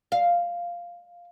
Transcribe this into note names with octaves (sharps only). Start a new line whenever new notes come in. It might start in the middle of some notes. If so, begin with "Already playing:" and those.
F5